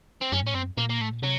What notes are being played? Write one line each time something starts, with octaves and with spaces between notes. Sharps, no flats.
C4
F#2 C#4
A2 C#4
F#2 C4
A#2 A#3
A#3
A2 A3
A#2
C3 F#3